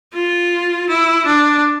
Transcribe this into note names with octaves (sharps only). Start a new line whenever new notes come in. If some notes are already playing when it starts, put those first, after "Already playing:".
F4
E4
D4